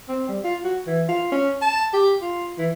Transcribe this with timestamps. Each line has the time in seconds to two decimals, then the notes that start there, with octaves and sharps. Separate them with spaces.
0.09 C4
0.29 G3
0.44 F4
0.64 F#4
0.87 E3
1.09 F4
1.32 C#4
1.62 A5
1.93 G4
2.22 F4
2.58 E3